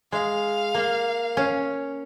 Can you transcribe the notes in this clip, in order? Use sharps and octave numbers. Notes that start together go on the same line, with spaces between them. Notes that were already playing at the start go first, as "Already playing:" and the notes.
G#3 F5
A#3
C#4